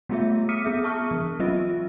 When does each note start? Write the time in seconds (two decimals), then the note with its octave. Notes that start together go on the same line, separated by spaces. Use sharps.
0.09 G3 A3 B3 F4 G#4 E5
0.49 D6 D#6 F6 B6 C#7 D#7
0.64 B3 G#4 E5
0.84 E5 A5 C#6 D#6 F6
1.11 E3
1.39 F#3 C4 C#4 F4 D#5 E5